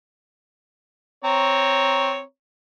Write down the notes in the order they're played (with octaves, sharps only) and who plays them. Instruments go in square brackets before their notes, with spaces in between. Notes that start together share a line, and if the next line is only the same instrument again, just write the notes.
[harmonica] C4 C#5 A#5